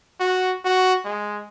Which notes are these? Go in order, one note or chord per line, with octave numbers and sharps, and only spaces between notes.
F#4
F#4
G#3